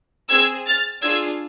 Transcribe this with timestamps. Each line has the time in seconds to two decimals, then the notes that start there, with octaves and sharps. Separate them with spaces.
0.29 C4 G#4 E6 G#6
0.66 F6 A6
1.02 D4 F4 G#4 E6 G#6